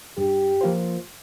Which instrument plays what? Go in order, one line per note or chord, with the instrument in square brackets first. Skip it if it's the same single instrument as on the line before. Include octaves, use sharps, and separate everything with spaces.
[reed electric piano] G2 [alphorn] G4
[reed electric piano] F3 A#3 F4 C5